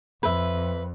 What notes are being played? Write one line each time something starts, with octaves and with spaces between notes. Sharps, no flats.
F2 B4 E5